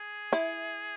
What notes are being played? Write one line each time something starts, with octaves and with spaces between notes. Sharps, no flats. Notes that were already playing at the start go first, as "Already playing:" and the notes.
Already playing: G#4
E4